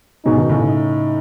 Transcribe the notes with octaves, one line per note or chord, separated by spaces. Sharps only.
G#2 B2 D#4
B2 D#3
A2 C#3
D#4